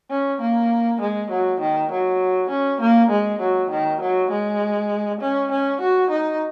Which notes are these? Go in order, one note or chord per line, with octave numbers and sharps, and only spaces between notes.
C#4
A#3
G#3
F#3
D#3
F#3
C#4
A#3
G#3
F#3
D#3
F#3
G#3
C#4
C#4
F#4
D#4